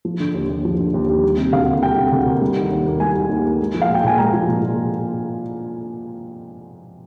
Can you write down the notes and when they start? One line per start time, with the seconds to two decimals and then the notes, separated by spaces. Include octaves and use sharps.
0.05 F3
0.20 D3
0.34 D#2
0.49 D#2
0.65 F3
0.79 D3
0.94 D#2
1.09 D#2
1.23 G3
1.38 C3
1.52 D2 F5
1.68 A#3
1.82 G3 G5
1.97 C3
2.12 D2
2.26 A#3
2.41 G3
2.56 D#3
2.71 D#2
2.86 A#3
3.00 G3 G#5
3.15 D#3
3.30 D#2
3.45 A#3
3.60 G#3
3.74 F3
3.82 F5
3.89 A#2
3.94 G5
4.04 A#2 G#5
4.18 G#3 A#5
4.34 F3
4.49 A#2
4.63 A#2